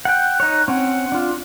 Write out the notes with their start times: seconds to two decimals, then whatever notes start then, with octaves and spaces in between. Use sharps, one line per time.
0.05 F#5 G5 F#6
0.40 D#4 C#5
0.68 C4 C#4 F#5
1.12 D4 F4